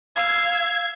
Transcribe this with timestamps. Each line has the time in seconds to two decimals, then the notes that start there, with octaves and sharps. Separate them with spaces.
0.16 F5 E6 G#6